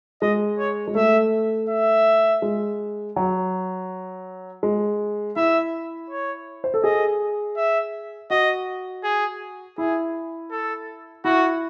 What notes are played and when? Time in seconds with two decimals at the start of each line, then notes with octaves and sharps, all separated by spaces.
0.22 G#3 D#5
0.59 C#5
0.88 G#3
0.95 A3 E5
1.69 E5
2.42 G#3
3.16 F#3
4.63 G#3
5.36 E4 E5
6.10 C#5
6.64 C5
6.74 A4
6.84 G#4 D#5
7.57 E5
8.30 F#4 D#5
9.04 G#4
9.77 E4 G#4
10.51 A4
11.25 E4 F#4